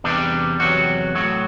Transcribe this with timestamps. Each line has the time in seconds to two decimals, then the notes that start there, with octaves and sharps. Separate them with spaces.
0.04 E2 C3 G3 D4
0.60 E2 C3 F#3 F#4
1.15 A2 F#3 F#4